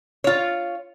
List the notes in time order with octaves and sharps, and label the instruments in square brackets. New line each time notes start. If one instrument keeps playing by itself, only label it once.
[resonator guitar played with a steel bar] F4 C#5